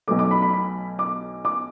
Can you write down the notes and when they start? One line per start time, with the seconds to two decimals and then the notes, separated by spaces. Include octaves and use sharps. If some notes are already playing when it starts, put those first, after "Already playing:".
0.08 B1 B2 F#3 A3 D6
0.19 D6
0.31 B5
0.42 B5
0.53 B5
0.99 D6
1.45 D6